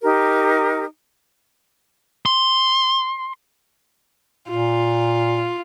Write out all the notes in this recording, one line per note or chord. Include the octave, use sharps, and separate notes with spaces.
D#4 G4 A#4
C6
A#2 F4